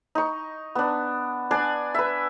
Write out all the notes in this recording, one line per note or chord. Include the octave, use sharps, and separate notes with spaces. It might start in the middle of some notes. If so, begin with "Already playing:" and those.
D#4 C#6
B3 D4
D4 D5 G#5
B4 E5